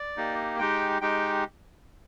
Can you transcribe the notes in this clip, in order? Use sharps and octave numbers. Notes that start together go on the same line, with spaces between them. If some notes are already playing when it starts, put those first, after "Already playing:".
Already playing: D5
A#3 D#4 G4
G#3 D#4 G4 G5
G#3 D#4 G4 G5